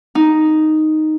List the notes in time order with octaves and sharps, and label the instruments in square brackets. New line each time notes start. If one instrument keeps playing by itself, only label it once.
[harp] D#4